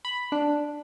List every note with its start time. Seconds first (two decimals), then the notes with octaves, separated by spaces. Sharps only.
0.05 B5
0.32 D4